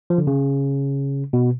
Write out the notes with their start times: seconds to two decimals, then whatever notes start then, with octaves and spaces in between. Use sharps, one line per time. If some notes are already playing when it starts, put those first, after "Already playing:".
0.10 F3
0.18 D3
0.27 C#3
1.33 B2